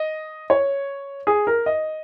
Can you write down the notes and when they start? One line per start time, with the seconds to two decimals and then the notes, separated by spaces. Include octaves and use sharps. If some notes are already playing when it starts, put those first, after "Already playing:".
Already playing: D#5
0.50 C#5
1.27 G#4
1.47 A#4
1.66 D#5